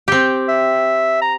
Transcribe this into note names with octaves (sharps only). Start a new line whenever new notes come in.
C4 G4
E5
A#5